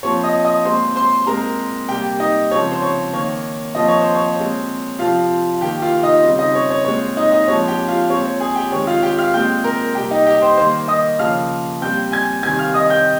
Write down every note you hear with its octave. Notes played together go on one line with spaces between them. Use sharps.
A#2 F3 C4 C#5 C#6
D#5 D#6
D#5 D#6
A#2 G#3 C4 C5 C6
C5 C6
A#2 G#3 C4 A#4 A#5
C3 G3 A#3 G4 G5
D#4 D#5
C#3 F3 G#3 C4 C#5
C5
C#5
D#3 A#3 C#5
A#2 F3 C4 D#5
C#5
C5
C#5
A#2 G#3 C4
C3 F3 C4 F4 F5
F5
D#3 A#3 G4 G5
F4 F5
D#4 D#5
C#3 G3 C4
D#4 D#5
C#5
C#5
A#2 G#3 C4 C#5
D#4 D#5
D#4 D#5
A#2 F3 G#3 C4 C#5
G4 G5
F4 F5
A#2 G#3 C4 C#5
C#5
G#4 G#5
G4 G5
D#3 G#3 C4 C#5
F4 F5
G4 G5
F5 F6
A#2 G#3 C4 G5 G6
A#4 A#5
C3 G3 A#3 G4 G5
D#4 D#5
G4 G5
C5 C6
D#3 G3 A#3 C5 C6
D#5 D#6
C#3 F3 A#3 F5 F6
A#2 G3 C4 G5 G6
G#5 G#6
C3 D#3 G3 C4 G#5 G#6
F5 F6
D#5 D#6
G5 G6